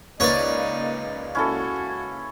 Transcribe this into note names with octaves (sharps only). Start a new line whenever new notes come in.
C#2 A#3 D#4 B4 C#5 D5
C#4 E4 F#4 A4